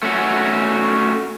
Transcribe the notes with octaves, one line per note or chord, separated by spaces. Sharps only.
A3 C#4 F#4